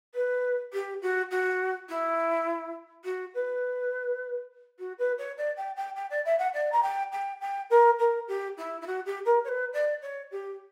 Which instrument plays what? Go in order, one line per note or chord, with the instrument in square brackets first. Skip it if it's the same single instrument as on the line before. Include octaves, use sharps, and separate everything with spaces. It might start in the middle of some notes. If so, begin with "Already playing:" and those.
[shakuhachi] B4
G4
F#4
F#4
E4
F#4
B4
F#4
B4
C#5
D5
G5
G5
G5
D5
E5
F#5
D5
A#5
G5
G5
G5
A#4
A#4
G4
E4
E4
F#4
G4
A#4
C#5
B4
D5
C#5
G4